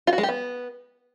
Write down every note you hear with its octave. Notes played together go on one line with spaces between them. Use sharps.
F4
F#4
G#3
G4
B3